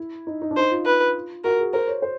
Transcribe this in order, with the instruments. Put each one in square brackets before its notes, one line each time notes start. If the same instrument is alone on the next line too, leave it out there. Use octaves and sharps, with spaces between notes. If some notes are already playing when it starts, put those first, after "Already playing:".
Already playing: [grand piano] E4
D#4
D#4
D4
[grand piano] D#4 [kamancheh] C5
[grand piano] F4
[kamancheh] B4
[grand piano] F#4 [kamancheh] A#4
[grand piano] G#4
[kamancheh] A#4 [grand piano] C5
[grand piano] C#5
C5